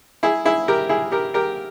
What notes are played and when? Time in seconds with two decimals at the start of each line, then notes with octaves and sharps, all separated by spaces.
0.23 E4 G#4
0.45 E4 G#4
0.68 G4 A#4
0.89 E4 G#4
1.12 G4 A#4
1.34 G4 A#4